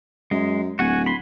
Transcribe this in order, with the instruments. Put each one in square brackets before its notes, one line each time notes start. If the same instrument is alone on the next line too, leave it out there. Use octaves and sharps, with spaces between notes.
[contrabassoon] F#2 [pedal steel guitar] G#3
[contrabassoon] D1 [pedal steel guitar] F#4 F#5 G#5
[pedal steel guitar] B5 C6